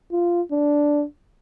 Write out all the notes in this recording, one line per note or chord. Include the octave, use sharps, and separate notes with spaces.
F4
D4